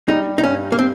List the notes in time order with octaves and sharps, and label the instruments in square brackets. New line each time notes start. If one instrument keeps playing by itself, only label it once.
[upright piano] G3 [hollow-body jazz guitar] D#4
[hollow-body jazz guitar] D#4
[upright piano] G2 [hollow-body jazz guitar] C#4
[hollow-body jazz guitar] A#3
C4